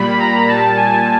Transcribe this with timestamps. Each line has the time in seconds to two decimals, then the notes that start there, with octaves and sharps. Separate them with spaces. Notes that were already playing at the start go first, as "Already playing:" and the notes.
Already playing: A#2 G3 B5
0.18 A#5
0.48 A#2 G3 A5
0.76 G#5